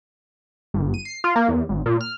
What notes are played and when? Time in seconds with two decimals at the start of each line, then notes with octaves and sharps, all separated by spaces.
0.74 G1
0.94 D#7
1.05 C7
1.24 F4
1.36 A#3
1.48 E2
1.69 G#1
1.86 A#2
2.01 F6